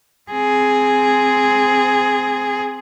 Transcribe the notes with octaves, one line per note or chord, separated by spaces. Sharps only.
C4 G#4